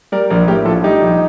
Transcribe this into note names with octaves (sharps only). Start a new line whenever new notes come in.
G3 A#4 D5
A#1 A#4 D5
A2 G4 A#4
A#1 F4 A4
G3 D#4 G4
A#1